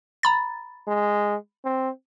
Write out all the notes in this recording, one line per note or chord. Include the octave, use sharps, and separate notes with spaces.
A#5 B5 A6
G#3
C4